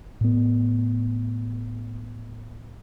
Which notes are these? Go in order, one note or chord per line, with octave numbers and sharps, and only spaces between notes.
A2 B3